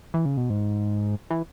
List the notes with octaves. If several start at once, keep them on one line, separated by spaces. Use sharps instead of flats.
E3
C#3
B2
G#2
E3